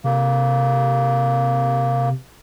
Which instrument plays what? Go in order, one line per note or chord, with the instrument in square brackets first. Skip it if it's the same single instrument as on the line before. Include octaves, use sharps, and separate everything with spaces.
[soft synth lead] C3 [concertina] A#3